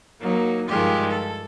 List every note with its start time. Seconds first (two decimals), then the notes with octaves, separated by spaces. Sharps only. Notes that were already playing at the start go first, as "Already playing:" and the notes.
0.21 F#3 A#3 D#4
0.68 G2 D#3 F3 G#3 F4 G4
1.11 A4